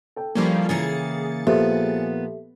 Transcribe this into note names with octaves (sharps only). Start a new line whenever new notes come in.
A4 G5
F3 G3 A#3 C#4 E4 F5
C#3 E3 A#3 G#4 A6 C#7
A#2 F3 A#3 B3 G4 A4 E5